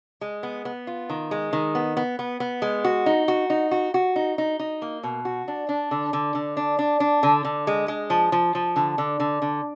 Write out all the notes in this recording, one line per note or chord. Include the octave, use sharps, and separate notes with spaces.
G#3
B3
B3
F4
D#3
G#3
D#3
B3
B3
B3
B3
G#3
F#4
D#4
F#4
D#4
F#4
F#4
D#4
D#4
D#4
A#3
B2
F#4
D4
D4
D3
D3
D3
D4
D4
D4
D3
D3
G#3
G#3
F3
F3
F3
D3
D3
D3
D3